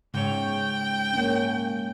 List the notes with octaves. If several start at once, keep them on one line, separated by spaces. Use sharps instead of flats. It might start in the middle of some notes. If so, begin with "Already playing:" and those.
G#2 C#3 C#5 G5
A#3 C#4